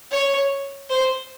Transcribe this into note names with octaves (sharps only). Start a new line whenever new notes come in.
C#5
C5